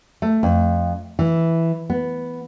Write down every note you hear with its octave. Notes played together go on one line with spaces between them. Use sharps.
A3
F2
E3
B3